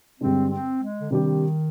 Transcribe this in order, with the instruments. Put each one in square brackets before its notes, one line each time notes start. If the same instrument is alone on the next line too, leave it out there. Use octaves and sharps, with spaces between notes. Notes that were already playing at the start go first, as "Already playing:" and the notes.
[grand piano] G2 D3 G#3 D4 [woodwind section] C4
[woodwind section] C4
G#3
D3
[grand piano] C3 G3 D4 G4 [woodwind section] D#3